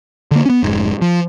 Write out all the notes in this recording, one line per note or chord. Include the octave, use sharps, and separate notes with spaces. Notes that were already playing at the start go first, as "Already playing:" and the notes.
D3 A#3
B3 C#4
F1 G#2
F3